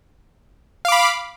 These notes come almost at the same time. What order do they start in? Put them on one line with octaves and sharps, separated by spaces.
F5 D6 B5